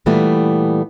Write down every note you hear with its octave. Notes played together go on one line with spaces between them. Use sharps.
A#2 E3 G3 A3 B3